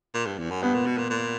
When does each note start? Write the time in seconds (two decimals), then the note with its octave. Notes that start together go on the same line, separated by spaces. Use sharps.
0.14 A#2
0.26 G2
0.38 E2
0.50 F#2
0.62 G2 B3
0.74 A#2
0.86 B2
0.98 A#2
1.10 A#2